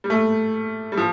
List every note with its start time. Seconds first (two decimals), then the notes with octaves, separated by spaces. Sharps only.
0.04 G3
0.10 A3
0.92 G3
0.97 F3